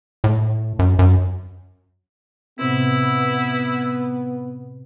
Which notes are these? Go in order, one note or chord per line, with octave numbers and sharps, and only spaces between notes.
A2
F#2
F#2
A2 C3 B3 C4 E4